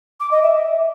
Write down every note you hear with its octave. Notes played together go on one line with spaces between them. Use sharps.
D6
D#5
E5